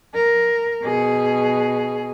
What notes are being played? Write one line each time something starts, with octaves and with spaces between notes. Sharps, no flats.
A#4
B2 G#4